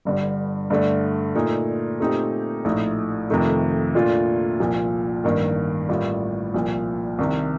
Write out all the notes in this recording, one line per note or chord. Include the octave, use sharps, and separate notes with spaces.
G1 G2 D3 G3
G2 D3 A3 D4
A#2 A3 D#4
A#2 A3 C4 D#4 G4
A#1 A2 A3 D#4
F2 C3 D#3 A3 D#4
A#2 A3 D4 F4
C2 A#2 F3
A1 G2 D#3 A#3
A1 A2 G3 A#3 F4
C2 A#2 F3
C2 C3 D#3